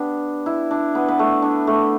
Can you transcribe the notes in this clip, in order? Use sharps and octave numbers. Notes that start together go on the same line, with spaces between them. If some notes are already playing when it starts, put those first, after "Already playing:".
Already playing: B3 D4 G4
E4
D4
B3
B3
A3
D4
A3